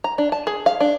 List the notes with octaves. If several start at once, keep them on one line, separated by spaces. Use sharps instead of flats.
A#5
D4
A5
G#4
F5
D4